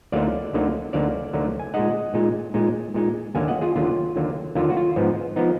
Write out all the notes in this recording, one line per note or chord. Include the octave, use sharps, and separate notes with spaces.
D2 D3 F#3 A#3 D#4 D5 F5
D2 D3 F#3 A#3 D#4
D2 D3 F#3 A#3 D#4 D5 F5
D2 D3 F#3 A#3 D#4
G#5
A#2 G#3 D#4 D#5 F#5
A#2 G#3 D#4
A#2 G#3 D#4
A#2 G#3 D#4
D#2 D3 F#3 A#3 F5 G#5
D#5 F#5
F4 G#4
D#2 D3 F#3 A#3 F4
D#2 D3 F#3 A#3
D#2 D3 F#3 A#3 F4
F#4
F4
G#2 F3 B3 D#4
F3 B3 D#4